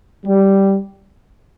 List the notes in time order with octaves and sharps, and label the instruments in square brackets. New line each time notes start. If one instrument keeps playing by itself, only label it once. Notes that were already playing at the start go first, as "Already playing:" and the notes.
[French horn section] G3